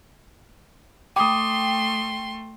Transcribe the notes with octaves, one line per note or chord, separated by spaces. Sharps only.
A3 G5 C6 D6 D#6